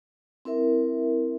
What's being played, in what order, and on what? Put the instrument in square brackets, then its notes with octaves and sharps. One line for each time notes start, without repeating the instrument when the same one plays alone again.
[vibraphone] C4 E4 A#4 E5